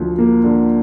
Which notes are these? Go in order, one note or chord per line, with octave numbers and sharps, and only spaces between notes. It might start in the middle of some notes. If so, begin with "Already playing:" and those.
Already playing: D2 F3
A#3
D3